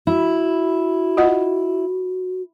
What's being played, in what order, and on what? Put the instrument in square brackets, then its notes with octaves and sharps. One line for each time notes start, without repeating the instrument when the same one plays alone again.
[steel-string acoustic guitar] E4 [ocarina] F#4
[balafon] F4 D#5 F#5